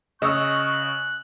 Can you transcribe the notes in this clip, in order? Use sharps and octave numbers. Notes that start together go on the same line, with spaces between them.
C#3 D#5 C#6 E6 F#6